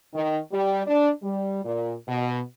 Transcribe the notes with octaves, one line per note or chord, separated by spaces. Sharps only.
D#3
G3
D4
G3
A#2
B2